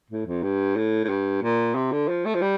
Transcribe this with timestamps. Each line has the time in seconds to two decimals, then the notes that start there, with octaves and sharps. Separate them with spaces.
0.10 A2
0.26 F2
0.43 G2
0.76 A2
1.04 A2
1.09 G2
1.42 A#2
1.75 C3
1.92 D3
2.08 F3
2.25 A3
2.34 F3
2.41 G3